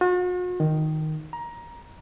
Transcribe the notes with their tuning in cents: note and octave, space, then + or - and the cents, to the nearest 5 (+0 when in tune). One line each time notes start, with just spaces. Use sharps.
F#4 -45
D#3 +0
A#5 +20